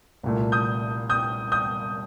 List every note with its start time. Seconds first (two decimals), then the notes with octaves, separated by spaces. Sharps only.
0.23 C2 A#2 A3
0.52 D#6 G6
1.10 D#6 G6
1.52 D#6 G6